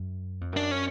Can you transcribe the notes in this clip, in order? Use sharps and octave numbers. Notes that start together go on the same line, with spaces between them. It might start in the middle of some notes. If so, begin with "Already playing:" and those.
Already playing: F#2
F2
F#2 D4
C#4